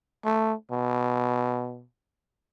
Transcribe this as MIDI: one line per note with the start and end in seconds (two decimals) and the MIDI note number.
0.25 0.54 57
0.71 1.84 47